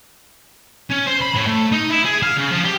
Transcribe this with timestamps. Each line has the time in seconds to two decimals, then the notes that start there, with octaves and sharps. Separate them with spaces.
0.90 C#4
1.07 C5
1.21 B5
1.35 A2
1.46 A3
1.72 D#4
1.90 E4
2.05 G#4
2.23 F5
2.37 C#3
2.51 F3
2.64 G4